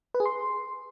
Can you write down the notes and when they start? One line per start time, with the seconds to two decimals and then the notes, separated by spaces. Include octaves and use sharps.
0.14 B4
0.20 G#4
0.25 C6